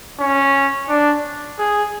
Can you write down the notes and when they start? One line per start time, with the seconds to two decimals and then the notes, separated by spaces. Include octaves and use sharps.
0.19 C#4
0.89 D4
1.59 G#4